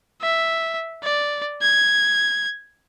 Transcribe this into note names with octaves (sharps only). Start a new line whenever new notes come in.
E5
D5
G#6